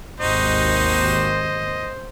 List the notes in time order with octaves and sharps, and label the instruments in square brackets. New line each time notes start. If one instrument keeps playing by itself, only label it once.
[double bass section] G#1 D#2 [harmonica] D#4 F#4 G4 [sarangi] C5 [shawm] D#5